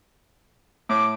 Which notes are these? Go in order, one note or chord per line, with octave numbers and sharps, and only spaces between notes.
A2 D6